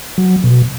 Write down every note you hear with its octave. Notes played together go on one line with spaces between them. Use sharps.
F#3
B2